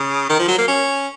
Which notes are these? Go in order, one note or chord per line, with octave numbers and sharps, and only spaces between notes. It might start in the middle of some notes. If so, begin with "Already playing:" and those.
Already playing: C#3
D#3
F3
F#3
A#3
C#4